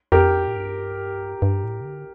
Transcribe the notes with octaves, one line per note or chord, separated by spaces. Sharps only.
F2 G4 A#4
A2
G2
G2
A2
C3
D3